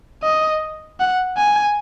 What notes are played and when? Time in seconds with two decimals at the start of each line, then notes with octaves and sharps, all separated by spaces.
0.23 D#5
1.00 F#5
1.37 G#5